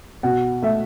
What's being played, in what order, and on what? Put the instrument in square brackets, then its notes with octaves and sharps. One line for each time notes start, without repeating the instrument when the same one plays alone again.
[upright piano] B2 F#5
A3 E5